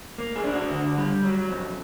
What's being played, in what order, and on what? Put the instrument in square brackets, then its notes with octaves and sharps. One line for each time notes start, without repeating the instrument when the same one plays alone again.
[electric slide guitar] A#3
G#4
D4
F#4
D3
G3
F#3
F2